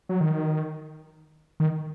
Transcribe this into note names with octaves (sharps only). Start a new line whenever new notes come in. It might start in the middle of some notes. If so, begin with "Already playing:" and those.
F#3
D#3
D#3